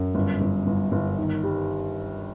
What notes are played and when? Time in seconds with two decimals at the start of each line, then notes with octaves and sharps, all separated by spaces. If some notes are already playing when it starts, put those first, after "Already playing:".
Already playing: F#2
0.15 G1
0.41 G1
0.67 G1
0.92 G1
1.18 D#3
1.44 G3